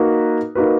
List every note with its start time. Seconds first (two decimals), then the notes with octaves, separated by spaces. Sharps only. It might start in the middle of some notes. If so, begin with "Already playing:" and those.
Already playing: A#3 D#4 F#4 B4
0.55 A#3 D#4 F#4 B4